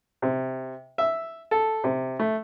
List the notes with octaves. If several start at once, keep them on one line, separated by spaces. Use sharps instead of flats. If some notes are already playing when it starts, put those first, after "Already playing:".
C3
E5
A4
C3
A3